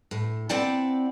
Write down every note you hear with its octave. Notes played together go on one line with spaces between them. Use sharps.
A2
C4 E4 D5 F#5 G5 A5